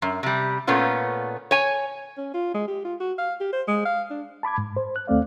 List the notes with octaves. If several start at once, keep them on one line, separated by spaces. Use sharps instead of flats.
F#2
C3 G3
A#2 A3 B3 C#4 F4
C#5 G#5
C#4
F4
G#3
G4
F4
F#4
F5
G4
C5
G#3
F5
D4
A5 B5 D6 G#6
G#2
C5
F#6
D#2 A3 C4 D5 F5